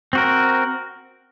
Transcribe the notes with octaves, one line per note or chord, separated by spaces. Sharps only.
C4 F#4 A#4